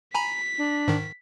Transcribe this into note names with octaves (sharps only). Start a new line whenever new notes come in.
G#5 A#5 B5 B6
D4
G#2 D#3